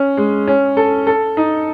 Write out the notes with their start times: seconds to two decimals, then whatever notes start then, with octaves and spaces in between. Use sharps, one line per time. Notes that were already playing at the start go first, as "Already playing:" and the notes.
Already playing: C#4
0.17 G#3
0.48 C#4
0.77 A4
1.07 A4
1.37 D#4